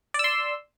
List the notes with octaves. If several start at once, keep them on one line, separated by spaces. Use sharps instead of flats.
D5 C6 E6